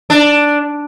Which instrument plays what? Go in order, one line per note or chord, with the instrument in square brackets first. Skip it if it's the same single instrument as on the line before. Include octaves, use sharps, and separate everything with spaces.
[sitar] D4